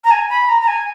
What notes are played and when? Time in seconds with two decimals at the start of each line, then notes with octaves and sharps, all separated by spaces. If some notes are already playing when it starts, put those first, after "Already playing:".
0.04 A#5
0.11 G#5
0.30 B5
0.49 A#5
0.61 A#5
0.68 G#5